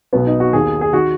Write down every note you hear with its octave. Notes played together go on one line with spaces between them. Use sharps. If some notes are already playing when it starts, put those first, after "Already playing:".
B1 B2 B3
D#4
F#4
D#2 D#3 G#4
G#4
D#3 F#4